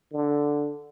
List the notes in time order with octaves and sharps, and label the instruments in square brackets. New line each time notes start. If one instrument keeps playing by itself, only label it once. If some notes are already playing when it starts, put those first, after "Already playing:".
[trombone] D3